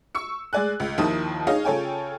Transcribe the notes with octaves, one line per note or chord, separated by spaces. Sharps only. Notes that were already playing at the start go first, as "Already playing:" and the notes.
C#6 E6 C#7
G#3 G#4 D5 G#5 F#6
C#2
D#2 D#3 F3 E4 A5 D#6
D#4 G#4 C#5 F5
C#3 F4 A4 C#5 G5 G#5